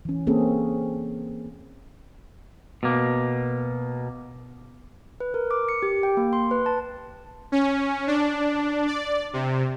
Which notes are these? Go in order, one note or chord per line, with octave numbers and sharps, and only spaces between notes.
E3 C#4
A#3 C4 C#4 G#4 A4
B2 A#3
B4
A#4
D6
C#7
G4
G5
A#3
C6
B4
A5
C#4
D4
D5
C3